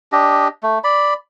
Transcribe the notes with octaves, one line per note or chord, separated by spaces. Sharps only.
D4 G4 D#5
A3
D5 B5